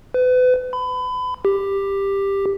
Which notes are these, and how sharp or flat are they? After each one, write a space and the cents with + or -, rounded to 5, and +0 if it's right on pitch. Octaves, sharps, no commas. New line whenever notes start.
B4 +35
B5 +30
G4 +10